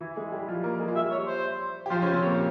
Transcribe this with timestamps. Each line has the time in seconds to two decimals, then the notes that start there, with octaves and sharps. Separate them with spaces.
0.01 E3 E4
0.16 G#3 G#4
0.32 G3 G4
0.48 F3 F4
0.63 A#3 A#4
0.79 G#3 G#4
0.88 F4
0.95 G3 G4 E5
1.11 C#5
1.27 C5
1.86 G4
1.90 F3 F4 C5
2.02 C#3 C#4 C5
2.13 C3 C4
2.22 C#5
2.26 A#2 A#3